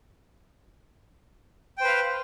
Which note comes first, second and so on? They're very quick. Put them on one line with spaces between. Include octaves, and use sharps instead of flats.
G5 C5 B4 F5